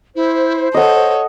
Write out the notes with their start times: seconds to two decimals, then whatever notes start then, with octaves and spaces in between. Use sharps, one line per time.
0.16 E4 C5
0.74 A4 C#5 D#5 F#5